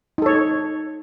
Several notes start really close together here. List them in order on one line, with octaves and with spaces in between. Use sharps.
D#4 A4 C#5